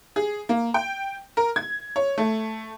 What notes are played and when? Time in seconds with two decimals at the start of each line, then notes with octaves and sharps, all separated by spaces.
0.16 G#4
0.49 A#3
0.74 G5
1.37 A#4
1.56 G#6
1.96 C#5
2.18 A3